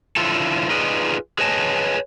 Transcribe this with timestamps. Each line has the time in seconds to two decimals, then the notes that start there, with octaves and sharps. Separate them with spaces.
0.16 D3 F3 E4 F4 A4
0.70 D#4 F4 G#4 B4 D5 D#5
1.39 G#4 B4 C#5 D#5 G#5 A5